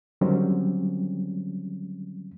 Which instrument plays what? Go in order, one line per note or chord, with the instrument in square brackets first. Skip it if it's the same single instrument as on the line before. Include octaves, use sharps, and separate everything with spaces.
[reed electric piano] D3 D#3 F#3 G3 C4 C#4